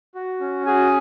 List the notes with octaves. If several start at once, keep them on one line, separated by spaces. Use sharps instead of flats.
F#4
C#4
F#4 G#4 G#5